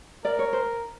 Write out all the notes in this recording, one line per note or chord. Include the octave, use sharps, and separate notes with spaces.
A#4 D5
C#5
C5